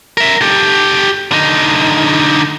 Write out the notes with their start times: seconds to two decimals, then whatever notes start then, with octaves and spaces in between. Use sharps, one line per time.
0.17 A#4 E5
0.41 G4 A4
1.32 D3 D#4